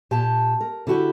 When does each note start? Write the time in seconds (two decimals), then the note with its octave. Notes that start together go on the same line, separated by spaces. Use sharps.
0.11 A#2 G4 A5
0.61 A#4
0.87 D3 E4 F#4 G4